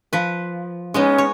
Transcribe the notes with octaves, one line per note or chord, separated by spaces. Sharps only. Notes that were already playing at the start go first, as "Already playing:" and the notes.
F3 B4
G#3 B3 C#4 D#4
C#5